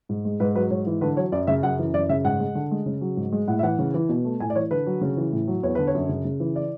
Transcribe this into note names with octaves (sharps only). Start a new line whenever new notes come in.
G#2
G#3
G#2 B4
F#3 B4
G#2 C#5
E3
D3 B4
F#3 C#5
F#2 D5
C#3 E5
F#2 F#5
E3
F#2 D5
C#3 E5
G#2 F#5
G#3
D3
G#3
C#3
F#3
G#2
G#3
A2 F#5
E5
E3 F#5
C#3
E3
B2
A3
A2 G#5
D5
E3 C#5
D3 B4
F#3
C#3
E3
A2
F#3
E2 C#5
D3 B4
C#5
F#2
C#3
C#3
E3
D5